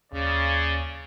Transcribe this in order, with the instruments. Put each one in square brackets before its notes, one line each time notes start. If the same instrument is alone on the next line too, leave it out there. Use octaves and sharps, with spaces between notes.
[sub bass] D#2 [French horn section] C#3 [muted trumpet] D5